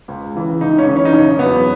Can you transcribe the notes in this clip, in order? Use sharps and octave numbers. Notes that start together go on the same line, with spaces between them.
C#2
C#3 E3
C#2 D#4
C#4
C#3 E3
C#4
D#4
E1 C#4
E2 C#3 F#3 B3